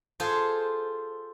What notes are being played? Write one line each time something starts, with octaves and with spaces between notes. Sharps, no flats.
F4 G#4 A4 C5